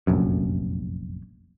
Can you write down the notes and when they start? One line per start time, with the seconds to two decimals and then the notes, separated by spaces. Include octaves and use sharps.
0.07 F1 A#1 F#2